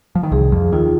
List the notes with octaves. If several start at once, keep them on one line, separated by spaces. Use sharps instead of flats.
F3
D#3
C2 C3 G#4
F2 F3
D#2 D#3 F4